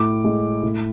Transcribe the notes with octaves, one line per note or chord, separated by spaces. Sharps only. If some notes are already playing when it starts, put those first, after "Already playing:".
Already playing: A2 D6
G#3
A2